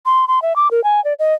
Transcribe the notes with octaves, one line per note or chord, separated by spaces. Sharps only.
C6
C6
E5
D6
A#4
G#5
D5
D#5